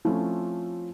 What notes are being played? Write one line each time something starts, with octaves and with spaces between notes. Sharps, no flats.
F3 A3 C4 C#4 E4 F4